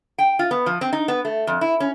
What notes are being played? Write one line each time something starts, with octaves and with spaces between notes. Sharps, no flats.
G5
F4
B3
F3
C4
D#4
B3
A3
F2
E4
C#4